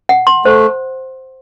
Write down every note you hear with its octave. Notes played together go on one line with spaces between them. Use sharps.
F#5
C6
A3 C5